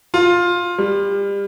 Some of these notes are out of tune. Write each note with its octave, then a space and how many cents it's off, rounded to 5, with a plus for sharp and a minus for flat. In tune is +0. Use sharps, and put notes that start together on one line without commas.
F4 +10
G3 +30